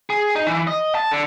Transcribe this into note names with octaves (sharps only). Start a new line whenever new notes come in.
G#4
D#4
E3
D#5
A5
D3